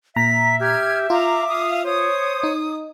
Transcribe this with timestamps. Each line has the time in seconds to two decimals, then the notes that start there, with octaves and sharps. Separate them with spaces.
0.16 A#2 E5 A#5 B6
0.60 G4 F6 G#6
1.10 F4 F5 A#5 D6
1.48 F5 D#6
1.84 C5 C#5 D#6
2.43 D#4